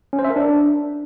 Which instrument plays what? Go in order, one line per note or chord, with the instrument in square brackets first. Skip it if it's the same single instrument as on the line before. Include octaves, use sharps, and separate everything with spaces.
[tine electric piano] C#4
C5
E5
A#4
D4